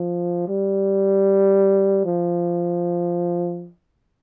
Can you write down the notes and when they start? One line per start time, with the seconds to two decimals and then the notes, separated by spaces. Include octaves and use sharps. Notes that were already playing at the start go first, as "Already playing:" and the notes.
Already playing: F3
0.48 G3
2.05 F3